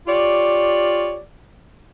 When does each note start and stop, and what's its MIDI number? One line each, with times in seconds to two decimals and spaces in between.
0.07 1.18 65
0.07 1.18 67
0.07 1.18 73
0.07 1.18 74